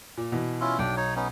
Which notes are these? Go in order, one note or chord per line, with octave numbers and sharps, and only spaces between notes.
A#2
B2 E3
C#4 E4 F4
B1 D4 G5
D#4 C#5
B3 C#4 D#4